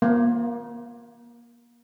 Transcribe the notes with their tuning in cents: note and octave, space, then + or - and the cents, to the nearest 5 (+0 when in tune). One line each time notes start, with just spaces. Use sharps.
A#3 +30